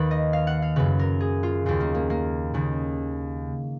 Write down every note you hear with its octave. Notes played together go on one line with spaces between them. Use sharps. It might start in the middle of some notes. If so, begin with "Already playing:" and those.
Already playing: D#2 D#3 B4
D#5
F5
F#5
F5
F#2 C#3 B4
A#4
G#4
F4
D#2 C#3 F4
A#3
A#3
A#3
D#2 C#3